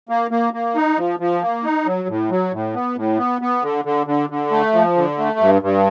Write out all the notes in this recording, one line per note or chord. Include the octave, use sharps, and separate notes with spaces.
A#3
A#3
A#3
D#4
F3
F3
A#3
D#4
F#3
A2
F#3
A2
B3
A2
B3
B3
D3
D3
D3
D3
A3
F3
D3
A3
G2
G2